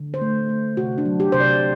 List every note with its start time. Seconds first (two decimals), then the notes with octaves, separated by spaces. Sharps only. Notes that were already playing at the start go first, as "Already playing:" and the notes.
Already playing: D3
0.14 C5
0.21 A3
0.49 A3
0.77 C3 F#4
0.98 D4
1.05 F#3
1.20 G4
1.32 C3 C5
1.40 D5